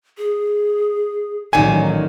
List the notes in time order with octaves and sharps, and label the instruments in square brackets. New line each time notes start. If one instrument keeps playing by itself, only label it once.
[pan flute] G#4
[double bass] A1 F#3 [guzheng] A#2 D#3 [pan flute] D#4 [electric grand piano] G#5